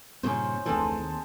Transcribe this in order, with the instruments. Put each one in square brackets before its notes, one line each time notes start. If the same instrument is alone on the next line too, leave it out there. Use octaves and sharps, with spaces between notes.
[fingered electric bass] G2 A#2 C#3 [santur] C#4 D#4 C5
[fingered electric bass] F1 D2 E3 [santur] G#3 C4 A4
[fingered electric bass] D#2